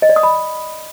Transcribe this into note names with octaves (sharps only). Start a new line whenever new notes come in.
D#5
D5
D#6
B5